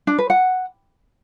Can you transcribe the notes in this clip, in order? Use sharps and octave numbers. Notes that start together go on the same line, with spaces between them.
D4
B4
F#5